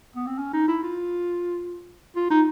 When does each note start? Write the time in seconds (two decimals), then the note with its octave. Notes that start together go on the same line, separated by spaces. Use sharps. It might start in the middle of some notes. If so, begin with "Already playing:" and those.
0.16 B3
0.27 C4
0.38 C#4
0.53 D#4
0.68 E4
0.83 F4
2.16 F4
2.30 D#4